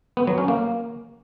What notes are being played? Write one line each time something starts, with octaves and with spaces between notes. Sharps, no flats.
B3
F#3
C#4
A#3